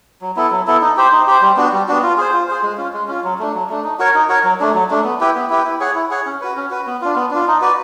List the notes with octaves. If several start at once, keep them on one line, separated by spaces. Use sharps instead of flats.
F#3
B3 E4 A4
F#3
B3 E4 A4
D#4
G4 C5
D#4
G4 C5
G3
B3 D4 F#4
G3
B3 D4 F#4
F4
G#4 C5
F4
G#4 C5
G#3
C#4 F4
G#3
C#4 F4
F#3
A3 D4
F#3
A3 D4
D#4
F#4 A#4 C#5
D#4
F#4 A#4 C#5
F#3
A3 D4
F#3
A3 D4
B3
E4 G4 B4
B3
E4 G4 B4
E4
G#4 C#5 F#5
E4
G#4 C#5 F#5
C#4
F#4 B4
C#4
F#4 B4
B3
D4 F4
B3
D4 F4
D#4
F#4 B4 D5